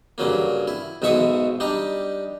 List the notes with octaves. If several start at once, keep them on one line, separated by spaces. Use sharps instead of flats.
G2 C#3 F#3 A#3
E4
B1 G#2 B2 E5 C#6 D#6
G3 D4 D#4